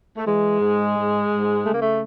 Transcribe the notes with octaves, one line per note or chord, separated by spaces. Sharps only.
A3
E3 G#3
G#2
G#2
G#2
C#3 A3
A#3
A3